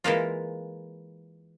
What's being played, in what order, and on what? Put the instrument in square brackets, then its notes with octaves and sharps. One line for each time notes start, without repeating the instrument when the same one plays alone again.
[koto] E3 G#3 A#3 F4